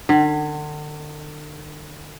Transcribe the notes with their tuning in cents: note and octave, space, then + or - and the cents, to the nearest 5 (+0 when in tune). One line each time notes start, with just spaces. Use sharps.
D3 +40